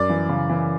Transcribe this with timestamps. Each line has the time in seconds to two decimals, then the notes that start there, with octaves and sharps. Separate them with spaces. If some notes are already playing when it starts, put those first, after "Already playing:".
Already playing: F#2 D5
0.10 E3
0.29 C#3
0.49 E3